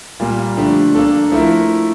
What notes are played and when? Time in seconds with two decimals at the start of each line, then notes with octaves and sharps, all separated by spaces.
0.20 A#2 G3 A#3
0.57 D3 F3 A3 D4 G4
0.94 A#3 D4 A4
1.32 F3 A3 E4 A#4